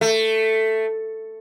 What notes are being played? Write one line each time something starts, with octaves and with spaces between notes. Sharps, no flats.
A3